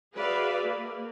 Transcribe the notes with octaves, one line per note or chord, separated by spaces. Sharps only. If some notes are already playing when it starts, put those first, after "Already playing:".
F#4 G#4 B4 D5 E5 F5
A#3